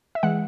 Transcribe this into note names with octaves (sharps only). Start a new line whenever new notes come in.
E5
E3 G#3 F#5